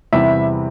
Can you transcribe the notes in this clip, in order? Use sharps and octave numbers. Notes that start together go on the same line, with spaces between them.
E2 C3 G3 C4 E4 E5